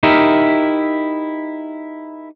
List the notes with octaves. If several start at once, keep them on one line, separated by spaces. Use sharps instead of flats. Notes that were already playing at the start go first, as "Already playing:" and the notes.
D#4 E4 G4 A#4 E5